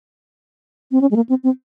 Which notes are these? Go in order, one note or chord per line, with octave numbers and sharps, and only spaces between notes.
C4
C#4
G#3
A#3
C4
C4